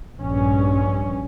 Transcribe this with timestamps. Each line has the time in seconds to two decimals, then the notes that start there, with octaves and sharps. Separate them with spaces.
0.17 A#1 G2 C#4